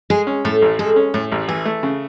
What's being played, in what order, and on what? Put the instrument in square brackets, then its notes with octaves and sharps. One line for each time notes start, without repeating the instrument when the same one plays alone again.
[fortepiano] G#3 [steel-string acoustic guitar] G#4
[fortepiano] C#4
[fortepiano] A2 [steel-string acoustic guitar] A4
[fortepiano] A1
[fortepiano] G#3 [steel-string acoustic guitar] A4
[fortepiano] C#4
[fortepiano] A2 [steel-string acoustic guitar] G#4
[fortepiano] A1
[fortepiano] E3 [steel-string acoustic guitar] G#4
[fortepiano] A3
C#3